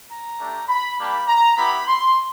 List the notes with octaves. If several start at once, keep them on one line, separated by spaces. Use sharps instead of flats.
A#5
A3 D4 G4
B5
G3 A#3 D4 G4 B5
A#5
B3 E4 G4 B5
C6